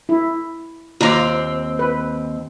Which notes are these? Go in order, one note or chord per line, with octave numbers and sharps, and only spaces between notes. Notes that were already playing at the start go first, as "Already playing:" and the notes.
E4
D#2 C4 F4 A#5 D6
B4